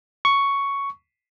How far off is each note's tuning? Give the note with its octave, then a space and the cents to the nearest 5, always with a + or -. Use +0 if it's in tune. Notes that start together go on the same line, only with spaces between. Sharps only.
C#6 +5